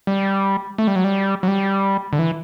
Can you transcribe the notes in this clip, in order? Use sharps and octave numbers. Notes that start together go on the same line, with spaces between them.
G3
A3
G3
F#3
G3
F#3
G3
D3
E3